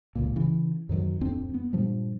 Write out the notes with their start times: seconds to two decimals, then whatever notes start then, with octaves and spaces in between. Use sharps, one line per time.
0.16 D1 G1 C#2 A#2
0.36 C#3 E3
0.89 F#2 C3 D#3 F#3
1.21 D1 F2 C4 D4
1.54 B3
1.73 G2 A#2 F3 G3